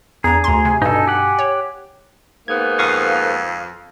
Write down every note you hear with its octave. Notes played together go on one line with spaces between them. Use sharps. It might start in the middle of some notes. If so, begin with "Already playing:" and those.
E2 D4 G#4 A#5
D2 A#5 C6
C3 G#5
G2 B2 D#4 A4 G#5
G4 F#5
C#5
G#2 A#3 B3 G#6
F2 F5 C#6 D#6